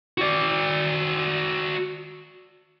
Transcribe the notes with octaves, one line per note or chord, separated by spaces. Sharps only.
F#4 D5